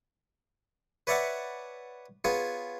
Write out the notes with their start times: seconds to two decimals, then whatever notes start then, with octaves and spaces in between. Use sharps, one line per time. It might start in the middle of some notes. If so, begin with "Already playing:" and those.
1.07 B4 C#5 D5 E5 F#5 A5
2.24 B3 F4 G#4 C#5